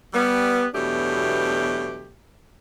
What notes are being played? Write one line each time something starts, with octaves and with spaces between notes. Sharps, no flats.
G3 B3
E2 B2 F#3 A3 D4 G4